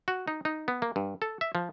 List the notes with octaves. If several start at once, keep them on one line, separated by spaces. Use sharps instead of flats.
F#4
D#4
D#4
B3
A#3
G2
A4
E5
F3